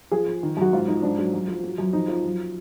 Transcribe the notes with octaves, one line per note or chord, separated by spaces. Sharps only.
F3 G#4
F3
D#3
F#2 F#4
G#2 F4
F3 D#4
G#2 D4
F#3
F#2
F3
F#3
F#2
F2 D#4
F3
F#2